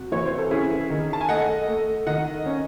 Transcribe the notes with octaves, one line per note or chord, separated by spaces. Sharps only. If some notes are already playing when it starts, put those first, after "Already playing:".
Already playing: C3 F#4
E3 C#5
C5
A4
C#4 E4 G#4
D#3
A5
G#5
A3 D#5 F#5
A3
D#3 D#5 F#5
C#4